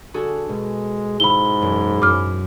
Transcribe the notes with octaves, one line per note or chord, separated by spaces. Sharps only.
D3 F#4 G#4 A4
B2 G#3
G#2 E4 B5 G7
E1 F#2
F#2 D6 F6